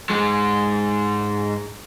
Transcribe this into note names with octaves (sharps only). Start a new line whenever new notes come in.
G#2 G#3